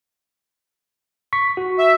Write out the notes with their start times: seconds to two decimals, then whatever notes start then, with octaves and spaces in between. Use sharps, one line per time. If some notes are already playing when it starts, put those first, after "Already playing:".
1.33 C#6 B6
1.57 F#4
1.78 E5